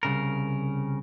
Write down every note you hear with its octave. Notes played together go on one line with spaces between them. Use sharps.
C2 C#3 A#4